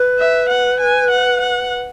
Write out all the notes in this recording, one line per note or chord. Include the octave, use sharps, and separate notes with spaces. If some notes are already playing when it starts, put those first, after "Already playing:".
Already playing: B4
E5
F#5
G#5
F#5
F#5